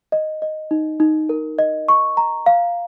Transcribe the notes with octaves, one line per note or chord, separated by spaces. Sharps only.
D#5
D#5
D#4
D#4
A#4
D#5
C#6
A#5
F5